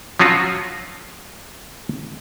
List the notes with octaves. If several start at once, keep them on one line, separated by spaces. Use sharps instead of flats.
F3 F#3 C#4 F4 F#4